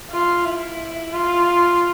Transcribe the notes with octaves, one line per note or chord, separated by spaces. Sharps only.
F4
E4
F4